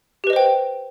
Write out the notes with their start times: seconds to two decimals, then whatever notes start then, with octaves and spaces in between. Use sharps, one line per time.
0.24 G4
0.27 B4
0.30 D#5
0.33 C5
0.36 G5